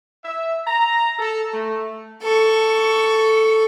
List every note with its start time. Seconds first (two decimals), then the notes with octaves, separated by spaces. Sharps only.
0.24 E5
0.67 A#5
1.18 A4
1.52 A3
2.22 A4 C#6